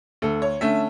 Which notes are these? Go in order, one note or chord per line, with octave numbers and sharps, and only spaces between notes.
D2 A4
C#5
D3 A3 C#4 E5